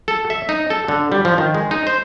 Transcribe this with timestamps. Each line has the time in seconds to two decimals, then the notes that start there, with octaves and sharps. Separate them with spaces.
0.08 A4
0.30 E5
0.49 D#4
0.70 A4
0.88 D3
1.12 G3
1.25 F3
1.38 D#3
1.54 G#3
1.71 D#4
1.87 C5